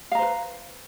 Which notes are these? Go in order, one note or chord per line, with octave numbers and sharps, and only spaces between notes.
B4 C5 F5 A#5